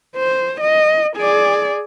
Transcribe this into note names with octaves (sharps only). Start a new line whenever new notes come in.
C5
D#5
G#4 D5